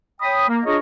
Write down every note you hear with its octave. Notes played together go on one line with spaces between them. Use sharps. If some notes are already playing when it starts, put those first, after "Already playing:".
C#5 G5 B5 D#6
A#3
D4 F4 G#4 A#4 C#5 D#5